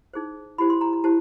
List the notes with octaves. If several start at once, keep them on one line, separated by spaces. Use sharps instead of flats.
D#4 G#4 C5
E4 G4 C5 B5
C6
A#5
A#5
E4 G4 C5 A5